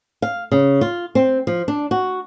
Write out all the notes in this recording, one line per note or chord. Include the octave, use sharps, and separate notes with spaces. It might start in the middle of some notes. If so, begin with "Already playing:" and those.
F5
C#3
F4
C4
F3
D4
F#4